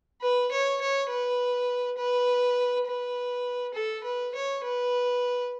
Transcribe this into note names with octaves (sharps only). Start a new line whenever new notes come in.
B4
C#5
C#5
B4
B4
B4
A4
B4
C#5
B4